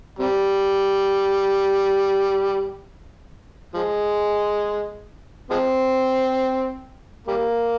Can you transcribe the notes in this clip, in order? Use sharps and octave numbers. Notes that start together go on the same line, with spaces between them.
C3 G3
F3 G#3
F3 G#3 C4
G3 A#3